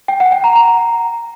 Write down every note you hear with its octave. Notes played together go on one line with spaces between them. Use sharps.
G5
F#5
G5
A#5
A#5